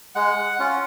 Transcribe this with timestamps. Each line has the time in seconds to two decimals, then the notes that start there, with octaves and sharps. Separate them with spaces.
0.15 G#3 F#5
0.59 C#4 F4 F#5